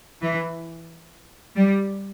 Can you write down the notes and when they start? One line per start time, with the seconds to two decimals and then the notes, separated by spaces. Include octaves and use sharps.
0.22 E3
1.56 G3